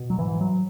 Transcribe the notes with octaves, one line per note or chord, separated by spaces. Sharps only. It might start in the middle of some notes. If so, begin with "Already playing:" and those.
Already playing: B2
F#3
G#2 E3
F#3